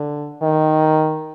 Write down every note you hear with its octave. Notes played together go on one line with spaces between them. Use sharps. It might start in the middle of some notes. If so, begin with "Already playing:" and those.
Already playing: D3
D#3